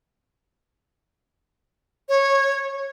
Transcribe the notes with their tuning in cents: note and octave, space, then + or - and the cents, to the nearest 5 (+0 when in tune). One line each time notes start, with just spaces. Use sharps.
C#5 -15